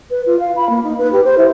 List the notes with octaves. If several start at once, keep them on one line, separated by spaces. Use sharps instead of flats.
B4
F4
F5
B5
A#3
D#4
B4
G4
C5
E4